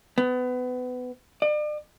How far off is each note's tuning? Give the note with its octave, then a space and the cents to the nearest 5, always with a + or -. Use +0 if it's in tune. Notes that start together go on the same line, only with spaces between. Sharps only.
B3 +25
D5 +40